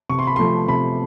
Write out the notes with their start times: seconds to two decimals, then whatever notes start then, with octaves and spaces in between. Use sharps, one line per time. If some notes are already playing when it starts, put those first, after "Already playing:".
0.09 C3 C#6
0.19 C6
0.27 B5
0.36 F3 A3 C6
0.68 C3 B5